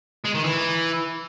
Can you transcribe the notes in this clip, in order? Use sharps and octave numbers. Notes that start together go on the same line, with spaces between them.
G#3
D#3
E3